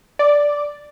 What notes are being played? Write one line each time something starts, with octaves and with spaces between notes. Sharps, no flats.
D5